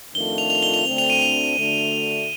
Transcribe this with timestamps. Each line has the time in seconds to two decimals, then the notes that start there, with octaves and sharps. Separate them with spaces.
0.15 F2 D#3 A3 D4 F4 G7
0.38 F7
0.50 F7
0.63 G7
0.74 F7
0.86 D2 D3 A3 C4
0.98 F7
1.10 D#7
1.22 F7
1.57 D2 D3 A3